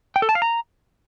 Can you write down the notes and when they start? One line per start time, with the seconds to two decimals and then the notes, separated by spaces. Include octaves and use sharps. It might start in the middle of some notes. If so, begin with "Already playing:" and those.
0.16 G5
0.22 A4
0.29 A5
0.35 F5
0.42 A#5